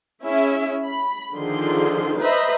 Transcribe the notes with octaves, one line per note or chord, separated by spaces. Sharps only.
C#4 E4 G#4 E5
B5
D3 D#3 F3 G#4 C6
B4 C5 D#5 E5 A#5 B5